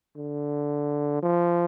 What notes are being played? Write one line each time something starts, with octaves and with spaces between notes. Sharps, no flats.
D3
F3